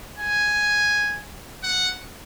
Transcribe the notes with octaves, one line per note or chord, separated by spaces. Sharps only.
G#5
F#5